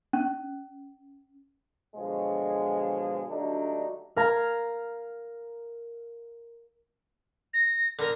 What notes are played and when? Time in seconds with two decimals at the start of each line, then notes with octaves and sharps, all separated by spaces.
0.13 C#4
1.96 B2 D3 F3 F#3 G#3
3.29 D3 F#3 G3 A3 D4 D#4
4.16 A#4 F5 A#5 G#6
7.53 A#6
7.99 D3 A#4